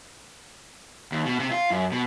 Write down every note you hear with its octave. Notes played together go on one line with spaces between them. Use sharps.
D#2
B2
C3
F4
F#2
B2